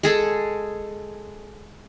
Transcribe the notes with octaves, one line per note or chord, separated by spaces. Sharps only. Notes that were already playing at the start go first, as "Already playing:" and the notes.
G#3 G#4 A4